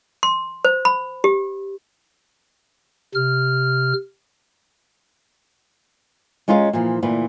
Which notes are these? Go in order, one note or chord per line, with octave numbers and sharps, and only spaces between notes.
C6
C5
B5
G4
C3 F6
G#3 C#4 F4 A#4 C5 F5
A#2 E3 F3
D2 A#2 E3 B4